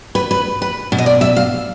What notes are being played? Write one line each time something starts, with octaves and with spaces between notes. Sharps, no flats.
B4
B4
B4
B2
D#5
D5
E5
F5